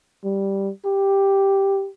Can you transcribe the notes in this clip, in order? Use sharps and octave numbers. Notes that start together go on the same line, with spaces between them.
G3
G4